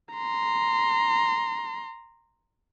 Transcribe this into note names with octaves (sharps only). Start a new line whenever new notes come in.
A#5 C6